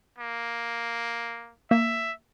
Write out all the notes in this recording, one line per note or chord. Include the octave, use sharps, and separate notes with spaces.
A#3
A#3 E5